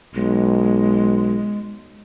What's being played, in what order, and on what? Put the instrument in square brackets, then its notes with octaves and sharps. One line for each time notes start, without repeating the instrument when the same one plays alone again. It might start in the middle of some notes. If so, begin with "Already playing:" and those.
[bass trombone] B1 [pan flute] G#3